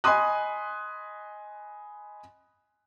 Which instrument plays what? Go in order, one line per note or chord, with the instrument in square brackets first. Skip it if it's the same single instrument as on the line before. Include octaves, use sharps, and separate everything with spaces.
[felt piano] D#5 G#5 B5 C6 D#6 F#6